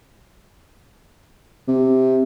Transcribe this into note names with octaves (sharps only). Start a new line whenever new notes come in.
C3